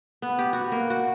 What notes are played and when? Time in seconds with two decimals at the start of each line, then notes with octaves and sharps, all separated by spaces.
0.22 B3
0.39 G4
0.53 F#4
0.72 A#3
0.90 F#4